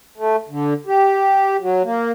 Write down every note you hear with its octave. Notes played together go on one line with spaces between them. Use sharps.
A3
D3
G4
F#3
A#3